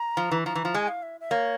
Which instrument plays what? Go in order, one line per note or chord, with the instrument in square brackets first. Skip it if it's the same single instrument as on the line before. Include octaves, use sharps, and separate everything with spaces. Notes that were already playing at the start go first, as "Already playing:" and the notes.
Already playing: [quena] A#5
[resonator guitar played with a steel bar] F3
E3
[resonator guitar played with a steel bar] F3 [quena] A#5
[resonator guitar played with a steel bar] E3
F3
[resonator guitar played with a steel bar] G#3 [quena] G#5
[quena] F5
E5
E5
[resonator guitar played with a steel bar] A#3 [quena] C#5